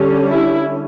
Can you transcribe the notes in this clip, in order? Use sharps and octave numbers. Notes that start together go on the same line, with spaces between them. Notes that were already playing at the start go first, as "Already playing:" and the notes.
Already playing: D3 G3 C#4
E4